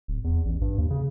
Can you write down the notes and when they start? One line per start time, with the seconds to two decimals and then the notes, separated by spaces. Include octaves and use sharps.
0.08 D1
0.24 E2
0.45 A1
0.61 G2
0.78 D#2
0.90 C#3